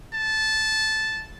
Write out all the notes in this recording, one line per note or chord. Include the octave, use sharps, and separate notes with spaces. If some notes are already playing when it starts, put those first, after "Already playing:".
A5